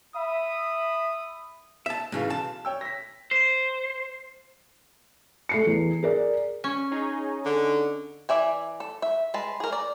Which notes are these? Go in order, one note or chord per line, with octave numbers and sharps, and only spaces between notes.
E5 B5 D#6
E5 A5
B1 G#2 C#3 E3 F5
A5
C#5 G5 E6
A#6 B6
C5
A3 C7 C#7
E2
G#4 A#4 D5
C#4
D#4 G#4 C#5
D3
E3 F#3 D5 E5 G#5
A4
E5
G#3 B4 A5
G#4 A#4
D5